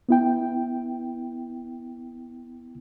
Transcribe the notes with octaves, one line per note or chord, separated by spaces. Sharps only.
B3 E4 G5